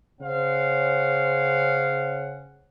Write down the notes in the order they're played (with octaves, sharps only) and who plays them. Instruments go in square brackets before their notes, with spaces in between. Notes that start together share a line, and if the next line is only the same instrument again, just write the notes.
[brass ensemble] C#3 C#4 C5 C#5 F5 F#5